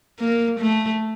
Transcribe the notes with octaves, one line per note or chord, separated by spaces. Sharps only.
A#3
A3